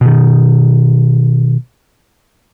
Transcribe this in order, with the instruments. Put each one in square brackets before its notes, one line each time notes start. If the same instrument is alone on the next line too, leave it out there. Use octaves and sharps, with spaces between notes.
[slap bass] B2 D#3